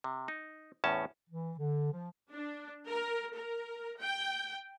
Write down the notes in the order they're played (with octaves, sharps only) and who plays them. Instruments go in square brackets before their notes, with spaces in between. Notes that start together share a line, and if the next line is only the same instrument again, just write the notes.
[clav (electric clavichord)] C3
D#4
E2 A2 C#4 A5
[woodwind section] E3
D3
F3
[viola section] D4
A#4
A#4
G5